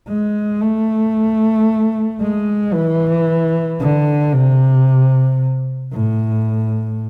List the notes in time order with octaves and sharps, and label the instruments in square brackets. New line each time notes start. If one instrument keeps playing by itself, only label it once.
[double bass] G#3
A3
G#3
E3
D3
C3
A2